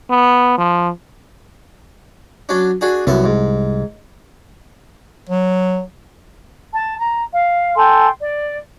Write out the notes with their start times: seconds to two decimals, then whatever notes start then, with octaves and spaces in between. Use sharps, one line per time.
0.10 B3
0.58 F3
2.49 F#3 C#4 D4
2.81 D4 F#4 G#4
3.07 C2 F#2 B3 E5
3.24 G#2
5.29 F#3
6.72 A5
6.97 A#5
7.31 F5
7.76 A4 G5 G#5 C6
8.20 D5